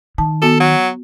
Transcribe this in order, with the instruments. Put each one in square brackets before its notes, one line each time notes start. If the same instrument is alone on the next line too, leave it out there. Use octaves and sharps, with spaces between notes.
[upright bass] D#3 [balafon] A5
[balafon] B3 F#4 [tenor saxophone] A4
[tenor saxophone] F#3